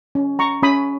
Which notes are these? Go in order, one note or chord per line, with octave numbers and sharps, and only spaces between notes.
C#4
A#5 C#6
C#4 B5 D#6